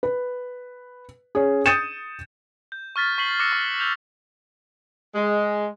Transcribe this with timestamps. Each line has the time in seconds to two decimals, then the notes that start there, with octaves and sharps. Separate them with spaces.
0.03 B4
1.35 C#4 G#4
1.66 D#6 G6 A6 C#7 D#7 E7
2.72 G6
2.96 C#6 F6 A6 B6
3.18 C#6 B6 C7 F#7
3.39 D6 E6 F#6 A#6 C#7
3.53 C#6
3.80 E6 G6 F7
5.15 G#3